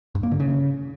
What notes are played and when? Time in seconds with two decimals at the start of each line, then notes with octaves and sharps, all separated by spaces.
0.15 G2
0.23 A#3
0.31 D3
0.40 C#3